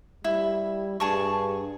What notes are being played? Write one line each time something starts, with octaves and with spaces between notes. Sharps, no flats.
G3 E4
G2 G#4 A5 C#6